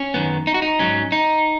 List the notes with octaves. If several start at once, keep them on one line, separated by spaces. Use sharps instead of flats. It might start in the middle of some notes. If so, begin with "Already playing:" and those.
Already playing: C#4
F#2 D#3 B3
D#4
F#4
D#4
G#2 F#3 C#4
D#4